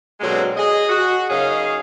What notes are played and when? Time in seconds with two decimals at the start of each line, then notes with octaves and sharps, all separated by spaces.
0.21 B2 D3 F#3 G#3 A#3 C4
0.57 G#4 D#5
0.89 F#4
1.30 F#2 C#3 D#4 G#4 F5